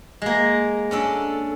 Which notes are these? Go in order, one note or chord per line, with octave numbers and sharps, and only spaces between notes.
G#3 A#3
C#4 D4 A4